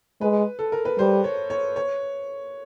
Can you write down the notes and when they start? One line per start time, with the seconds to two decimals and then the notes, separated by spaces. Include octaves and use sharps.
0.21 G#3 B4
0.59 A4
0.72 A#4
0.85 B4
0.98 G3 C5
1.24 C#5
1.50 C#5
1.76 C#5